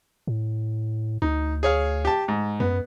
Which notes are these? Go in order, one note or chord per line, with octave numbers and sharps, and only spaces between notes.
A2
D2 D#4
G#4 C#5 F5
G4 A5
G#2
F#2 B3